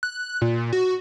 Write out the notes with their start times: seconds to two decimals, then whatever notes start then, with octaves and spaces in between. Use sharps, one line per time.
0.03 F#6
0.41 A#2
0.73 F#4